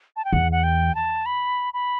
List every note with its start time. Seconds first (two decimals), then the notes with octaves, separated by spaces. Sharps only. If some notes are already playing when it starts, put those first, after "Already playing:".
0.16 A5
0.25 G5
0.32 E2 F#5
0.52 F#5
0.63 G5
0.95 A5
1.26 B5
1.74 B5